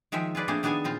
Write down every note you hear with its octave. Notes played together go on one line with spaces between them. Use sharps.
D#3 F3 G#3 E5 G5
F4 G#4 B4 D5
A3 A#3 C4 D4 G#4 A4
D#3 B3 D4 G#4 A4 G#5
A#2 C4 F4